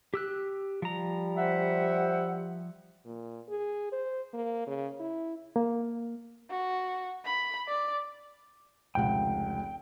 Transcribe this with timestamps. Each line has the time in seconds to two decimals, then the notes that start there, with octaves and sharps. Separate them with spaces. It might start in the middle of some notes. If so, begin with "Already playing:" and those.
0.14 G4 E6 F#6
0.82 F3 G3 A#5
1.37 C5 E5 F#5
3.05 A#2
3.49 G#4
3.92 C5
4.34 A#3
4.67 C#3
5.00 E4
5.56 A#3
6.50 F#4
7.25 B5
7.68 D5
8.95 F1 C#2 F#5 G5